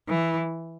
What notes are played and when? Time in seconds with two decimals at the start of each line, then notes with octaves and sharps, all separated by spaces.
0.08 E3